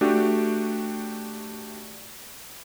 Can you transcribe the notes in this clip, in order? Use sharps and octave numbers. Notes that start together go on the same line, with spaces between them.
A3 D4 F#4 G4